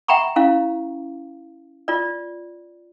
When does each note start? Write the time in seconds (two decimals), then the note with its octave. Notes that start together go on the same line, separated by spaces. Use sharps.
0.08 E5 F#5 G5 A#5 B5 C#6
0.36 C#4 E4 F5
1.88 F4 D5